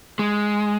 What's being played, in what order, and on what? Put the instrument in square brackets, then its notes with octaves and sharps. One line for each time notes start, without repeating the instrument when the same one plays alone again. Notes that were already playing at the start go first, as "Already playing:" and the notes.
[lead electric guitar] G#3